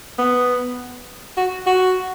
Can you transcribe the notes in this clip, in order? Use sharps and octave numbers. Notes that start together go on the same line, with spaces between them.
B3
F#4
F#4